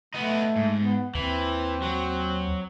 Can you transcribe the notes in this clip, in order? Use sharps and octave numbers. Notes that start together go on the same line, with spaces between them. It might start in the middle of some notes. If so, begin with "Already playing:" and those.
A3 B3 D#4
G#2
B3
D#2 E3 C4
F#3